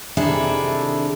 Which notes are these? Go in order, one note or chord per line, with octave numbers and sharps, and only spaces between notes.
C3 D#3 D4 E4 G#4 A4